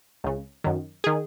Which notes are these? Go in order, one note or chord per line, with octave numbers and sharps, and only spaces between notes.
C#2 C#3
F#2 D#3
D#3 G#4